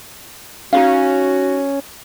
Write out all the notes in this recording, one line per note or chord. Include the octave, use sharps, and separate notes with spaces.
C#4 D#4 F4 F#4 F5